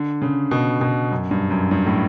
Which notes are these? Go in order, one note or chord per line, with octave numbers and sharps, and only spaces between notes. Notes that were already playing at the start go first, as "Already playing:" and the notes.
Already playing: D3
C#3
B2
B2
F#2
G2
F#2
G2
A2